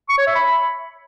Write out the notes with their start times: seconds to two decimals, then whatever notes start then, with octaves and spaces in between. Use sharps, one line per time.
0.09 C#6
0.18 C#5
0.26 E5
0.35 B5